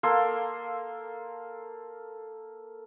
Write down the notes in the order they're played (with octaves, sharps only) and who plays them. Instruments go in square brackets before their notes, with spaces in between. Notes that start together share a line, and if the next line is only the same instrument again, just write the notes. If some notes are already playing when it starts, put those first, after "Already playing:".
[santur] A#3 A4 C6 E6